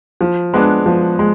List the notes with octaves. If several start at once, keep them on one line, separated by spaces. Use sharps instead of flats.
F3
G#3 B3 D4
F3
G#3